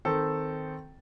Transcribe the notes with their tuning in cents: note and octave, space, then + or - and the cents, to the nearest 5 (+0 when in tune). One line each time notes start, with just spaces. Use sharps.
D#3 +0 C4 -10 A4 +0